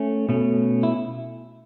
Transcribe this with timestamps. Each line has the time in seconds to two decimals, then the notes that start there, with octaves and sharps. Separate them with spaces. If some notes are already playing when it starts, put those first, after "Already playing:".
Already playing: A3 C#4
0.29 B2 A3 C#4
0.83 E4